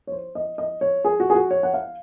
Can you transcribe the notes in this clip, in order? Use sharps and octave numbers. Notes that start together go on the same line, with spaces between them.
C#5
C5
D#5
D#5
C#5
G#4
F#4
G#4
F#4
C#5
F#5
F5